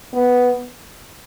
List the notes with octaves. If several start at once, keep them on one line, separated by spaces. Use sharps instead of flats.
B3